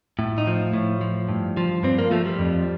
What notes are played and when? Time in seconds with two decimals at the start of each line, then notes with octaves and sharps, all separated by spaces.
0.19 A2
0.38 D#4
0.47 F3
0.74 A2
1.01 F3
1.29 G2
1.57 F3
1.83 G2 C4
1.98 A#3
2.11 F3 A3
2.26 G3
2.39 F2